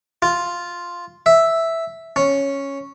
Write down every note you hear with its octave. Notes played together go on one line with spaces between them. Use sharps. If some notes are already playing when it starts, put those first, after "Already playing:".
F4
E5
C#4